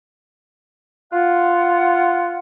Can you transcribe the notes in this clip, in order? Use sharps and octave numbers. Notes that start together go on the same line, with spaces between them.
F4 F#5